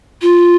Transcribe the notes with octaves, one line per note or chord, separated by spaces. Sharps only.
F4